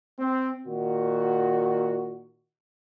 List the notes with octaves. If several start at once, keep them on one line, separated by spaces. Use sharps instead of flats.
C4
A#2 D#3 F#4